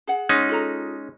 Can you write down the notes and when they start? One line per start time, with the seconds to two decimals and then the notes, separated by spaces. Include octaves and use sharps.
0.07 G#4 F#5
0.29 G#3 C#4 D#4
0.49 F4 A4 A#5